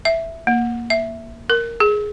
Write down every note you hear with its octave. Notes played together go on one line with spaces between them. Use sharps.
E5
A#3
E5
A#4
G#4